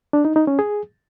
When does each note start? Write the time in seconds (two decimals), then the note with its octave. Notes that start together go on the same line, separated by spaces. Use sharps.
0.13 D4
0.25 D#4
0.36 D#4
0.47 C#4
0.59 G#4